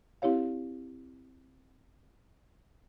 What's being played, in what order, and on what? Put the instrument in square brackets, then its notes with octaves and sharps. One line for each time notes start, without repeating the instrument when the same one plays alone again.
[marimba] C4 E4 G4 C#5 F5